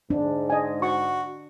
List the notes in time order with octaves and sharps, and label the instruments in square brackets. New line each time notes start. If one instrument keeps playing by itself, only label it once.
[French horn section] G#2 [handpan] D4
[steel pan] D#5 G#5
[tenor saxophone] F#4 [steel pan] C#6